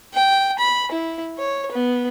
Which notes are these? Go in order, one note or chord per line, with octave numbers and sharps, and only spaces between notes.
G5
B5
E4
C#5
B3